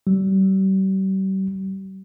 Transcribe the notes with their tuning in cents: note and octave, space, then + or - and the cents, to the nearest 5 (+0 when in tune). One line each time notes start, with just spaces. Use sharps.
G3 -40